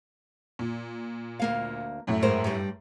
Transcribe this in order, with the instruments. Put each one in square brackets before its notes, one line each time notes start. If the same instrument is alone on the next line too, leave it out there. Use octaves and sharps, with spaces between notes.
[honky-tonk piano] A#2
[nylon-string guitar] D2 A#3 F5
[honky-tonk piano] F#2 A2 A3
[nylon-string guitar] G#2 A#4 C5
G2 G3